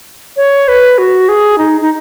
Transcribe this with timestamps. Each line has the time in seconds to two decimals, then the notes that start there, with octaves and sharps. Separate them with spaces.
0.37 C#5
0.68 B4
0.98 F#4
1.29 G#4
1.58 D#4
1.81 D#4